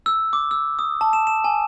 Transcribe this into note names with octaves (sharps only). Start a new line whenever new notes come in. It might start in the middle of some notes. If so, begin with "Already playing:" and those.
E6
D6
E6
D#6
A5
E7
E7
G#5